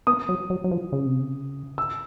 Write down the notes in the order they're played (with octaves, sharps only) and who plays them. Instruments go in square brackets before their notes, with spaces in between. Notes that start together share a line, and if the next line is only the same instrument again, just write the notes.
[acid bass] B3 [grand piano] D#6
[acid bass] F#3
F#3
F#3
F3
C#3
C3
C#3
[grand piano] E6